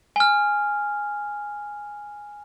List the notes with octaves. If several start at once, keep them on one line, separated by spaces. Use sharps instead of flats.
G#5 F6